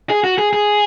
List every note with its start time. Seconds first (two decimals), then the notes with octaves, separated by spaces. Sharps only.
0.10 G#4
0.24 F#4
0.38 G#4
0.53 G#4